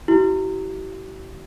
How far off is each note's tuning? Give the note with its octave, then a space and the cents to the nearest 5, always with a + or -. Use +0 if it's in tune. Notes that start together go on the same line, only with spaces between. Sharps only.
E4 +0 G4 -45